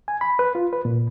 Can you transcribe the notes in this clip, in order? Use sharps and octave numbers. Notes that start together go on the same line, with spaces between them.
G#5
B5
B4
F4
B4
A#2